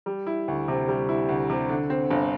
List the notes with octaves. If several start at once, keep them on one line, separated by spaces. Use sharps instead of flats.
G3
E4
D2
C3
G3
E4
D2
C3
D3
C4
G1